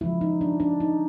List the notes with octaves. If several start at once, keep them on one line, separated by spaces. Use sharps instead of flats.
C#3 F3 G#3 E4
D#4
D4
D4
D#4